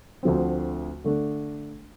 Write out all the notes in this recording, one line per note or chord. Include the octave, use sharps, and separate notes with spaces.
D2 D3 F3 A3 C4
D3 A3 D4